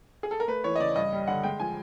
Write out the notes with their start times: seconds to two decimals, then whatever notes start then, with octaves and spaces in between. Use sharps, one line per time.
0.23 G#4
0.31 A4
0.40 A#4
0.47 A3 B4
0.64 E3 C#5
0.75 D#5
0.80 C#3 D5
0.95 G2 D#5
1.13 G3
1.27 D3 F#5
1.43 G#3 G5
1.60 F3 G#5